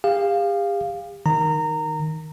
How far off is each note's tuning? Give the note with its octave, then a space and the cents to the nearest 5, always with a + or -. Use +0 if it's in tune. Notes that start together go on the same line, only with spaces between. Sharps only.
G4 +45 F5 +0
D#3 +0 A#5 -20